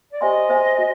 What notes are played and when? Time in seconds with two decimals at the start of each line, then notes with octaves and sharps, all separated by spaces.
0.10 D5
0.21 G4 C5 D#5 E5 G#5 C6
0.49 G#4 C5 E5 G#5 C6
0.79 F#4